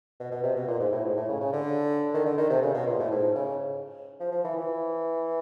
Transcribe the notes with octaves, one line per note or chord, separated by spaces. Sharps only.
B2
B2
C3
B2
A#2
G#2
A2
G#2
A2
C#3
C#3
D3
D#3
D3
D#3
C3
C#3
B2
A#2
A2
G#2
C#3
F3
F3
E3
E3